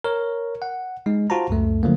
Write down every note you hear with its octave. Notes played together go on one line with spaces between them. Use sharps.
A#4 C#5
F#5
G#3 D#4
F4 F#4 C5 A5 A#5
C#2 F#2 A3
D3 F3 F#3 A3 A#3